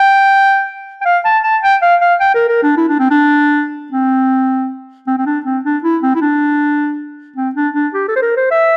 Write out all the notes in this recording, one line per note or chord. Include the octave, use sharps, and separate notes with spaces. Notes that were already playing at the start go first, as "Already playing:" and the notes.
Already playing: G5
G5
F5
A5
A5
G5
F5
F5
G5
A#4
A#4
D4
E4
D4
C4
D4
C4
C4
C4
D4
C4
D4
E4
C4
E4
D4
C4
D4
D4
G4
A4
C5
A#4
C5
E5